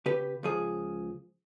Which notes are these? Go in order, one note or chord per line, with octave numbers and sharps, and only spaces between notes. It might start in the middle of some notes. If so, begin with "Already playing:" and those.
C#3 G4 B4
C#2 F3 G#4